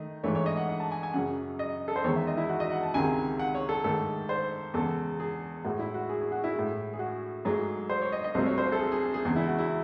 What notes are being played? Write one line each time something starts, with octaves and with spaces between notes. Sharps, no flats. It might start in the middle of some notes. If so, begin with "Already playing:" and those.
Already playing: D#3 A3 D#5
G#2 E3 A3 C#5
C#5
D#5
F#5
F#5
A5
G#5
G#5
F#2 C#3 F#3 F#5
D#5
A4
C5
E2 D#3 G#3 C#5
E5
D#5
E4
F#4
D#5
F#5
A5
C#2 C3 D#3 G#3 G#5
F#5
C#5
A4
G#2 D#3 A3 A4
C5
E2 C#3 G#3 A4
G#4
A2 G#3 F#4
E4
F#4
G#4
G#4
F#4
E4
A2 G#3
G#4
F#4
G#2 F#3 A3 G#4
C5
C#5
D#5
D#5
C2 C3 F#3 A3 C5
C#5
C5
A4
G#4
G#4
G#4
E2 C#3 G#3
E4
F#4
E4